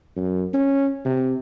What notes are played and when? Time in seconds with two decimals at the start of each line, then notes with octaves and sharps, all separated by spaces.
0.16 F#2
0.54 C#4
1.05 C3